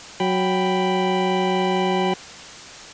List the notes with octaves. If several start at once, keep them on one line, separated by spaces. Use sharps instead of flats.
F#3 G5 B5